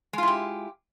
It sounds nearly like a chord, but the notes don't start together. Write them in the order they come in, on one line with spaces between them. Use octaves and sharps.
G#3 F4 E4 G4